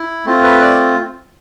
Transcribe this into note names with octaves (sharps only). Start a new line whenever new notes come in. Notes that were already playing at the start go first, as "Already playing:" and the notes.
Already playing: E4
A3 C4 F4
B4
D5